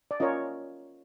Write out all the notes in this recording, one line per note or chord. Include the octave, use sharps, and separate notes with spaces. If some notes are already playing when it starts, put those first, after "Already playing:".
D5
C#4 F4 A#4 C#5 D#5